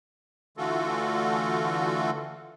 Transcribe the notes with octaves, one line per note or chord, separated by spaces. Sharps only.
D3 E3 A3 F4 F#4 A4